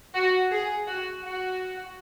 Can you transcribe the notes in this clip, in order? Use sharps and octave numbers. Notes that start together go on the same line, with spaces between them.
F#4
G#4
F#4
F#4